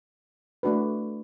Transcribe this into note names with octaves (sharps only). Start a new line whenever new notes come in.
A3 D4 F#4 B4